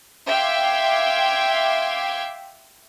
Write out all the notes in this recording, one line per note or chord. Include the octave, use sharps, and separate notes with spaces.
E5 F5 G5 C6 D6 G#6